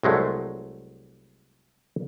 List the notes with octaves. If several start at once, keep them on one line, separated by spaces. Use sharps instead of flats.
C2 F#3 G#3 A3